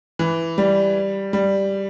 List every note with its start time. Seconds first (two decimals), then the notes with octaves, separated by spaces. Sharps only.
0.19 E3
0.58 G3
1.33 G3